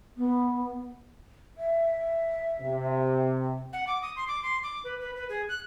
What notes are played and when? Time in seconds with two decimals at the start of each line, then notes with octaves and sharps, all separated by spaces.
0.17 B3
1.58 E5
2.60 C3
3.73 F#5
3.87 D6
4.02 D#6
4.16 C6
4.28 D6
4.43 C6
4.63 D6
4.84 B4
5.01 B4
5.16 B4
5.29 G#4
5.49 F#6